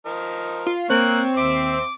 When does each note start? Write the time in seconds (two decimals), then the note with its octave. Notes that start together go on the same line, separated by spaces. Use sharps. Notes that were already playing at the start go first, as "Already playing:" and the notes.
0.06 F3 A#4 D#5
0.67 F4
0.90 A#3 C4 C#5 F#6
1.36 D#2 C5 E5 D6